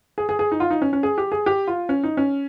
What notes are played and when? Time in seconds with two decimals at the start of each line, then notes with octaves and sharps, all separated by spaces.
0.18 G#4
0.29 G#4
0.39 G#4
0.52 D#4
0.60 F4
0.71 D#4
0.82 C#4
0.93 C#4
1.03 G#4
1.18 G4
1.32 G#4
1.46 G4
1.67 F4
1.89 C#4
2.04 D#4
2.17 C#4